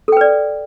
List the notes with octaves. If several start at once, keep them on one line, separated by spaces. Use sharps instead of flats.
A4 B4 D5 G5